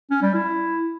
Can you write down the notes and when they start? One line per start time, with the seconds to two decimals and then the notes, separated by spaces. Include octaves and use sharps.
0.11 C#4
0.22 G3
0.34 E4